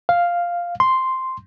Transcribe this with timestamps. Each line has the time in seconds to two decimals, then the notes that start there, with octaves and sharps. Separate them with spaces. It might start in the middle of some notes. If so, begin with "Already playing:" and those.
0.09 F5
0.80 C6